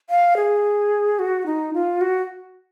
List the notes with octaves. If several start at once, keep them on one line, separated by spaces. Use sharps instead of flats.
F5
G#4
F#4
D#4
F4
F#4